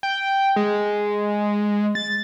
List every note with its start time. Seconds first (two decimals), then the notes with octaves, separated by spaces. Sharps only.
0.03 G5
0.56 G#3
1.95 A6